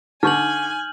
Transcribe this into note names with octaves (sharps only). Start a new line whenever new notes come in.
D3 D#4 G#5 C#6 F6 G6 F#7